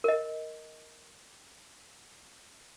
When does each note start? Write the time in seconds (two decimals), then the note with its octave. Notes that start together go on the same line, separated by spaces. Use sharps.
0.04 A#4 D#5